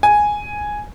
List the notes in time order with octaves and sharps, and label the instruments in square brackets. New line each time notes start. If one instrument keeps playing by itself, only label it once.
[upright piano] G#5